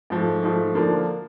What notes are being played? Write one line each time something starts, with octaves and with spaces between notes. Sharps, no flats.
G#2 F3 A3
G#2 F3 A3
D3 F3 A#3 D4